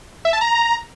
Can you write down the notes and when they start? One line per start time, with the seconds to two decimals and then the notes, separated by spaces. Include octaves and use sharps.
0.25 E5
0.33 A5
0.41 A#5